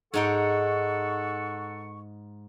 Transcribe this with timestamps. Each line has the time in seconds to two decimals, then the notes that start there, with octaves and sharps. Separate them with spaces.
0.14 G#2 D#4 A4 F#5 G5 C#6